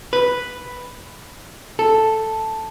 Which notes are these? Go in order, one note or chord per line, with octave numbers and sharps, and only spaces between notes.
B4
A4